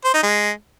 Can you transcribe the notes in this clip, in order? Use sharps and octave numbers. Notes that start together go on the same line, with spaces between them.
C5
D#4
G#3